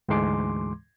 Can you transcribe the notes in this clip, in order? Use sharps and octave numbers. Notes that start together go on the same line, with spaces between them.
D2 G#2 E3 G#3 C6 D6